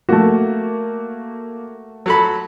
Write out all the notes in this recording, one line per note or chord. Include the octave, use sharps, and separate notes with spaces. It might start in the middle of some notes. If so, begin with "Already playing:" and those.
A3 A#3 F#4
F#3 A4 B5